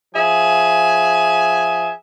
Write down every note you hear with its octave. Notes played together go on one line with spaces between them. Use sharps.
F3 G#4 E5 G#5